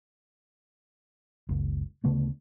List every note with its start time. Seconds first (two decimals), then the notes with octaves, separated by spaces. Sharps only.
1.49 F#1 C#2
2.04 D2 C#3 A3 B3